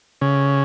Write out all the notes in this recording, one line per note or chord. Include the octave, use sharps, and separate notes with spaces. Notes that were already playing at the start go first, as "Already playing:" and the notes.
C#3